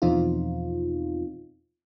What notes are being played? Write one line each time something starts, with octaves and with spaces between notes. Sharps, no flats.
E2 B2 F3 C4 D#4 F4